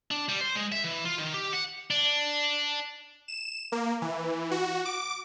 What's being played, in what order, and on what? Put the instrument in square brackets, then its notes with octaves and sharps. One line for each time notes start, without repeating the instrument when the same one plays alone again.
[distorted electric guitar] D4
G3
C5
G#3
E5
E3
F4
D#3
G4
F#5
D4
[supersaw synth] E7
A#3
E3
F#4
D6